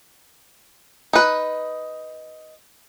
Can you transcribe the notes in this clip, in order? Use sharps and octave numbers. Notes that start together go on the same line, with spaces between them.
D#4 B4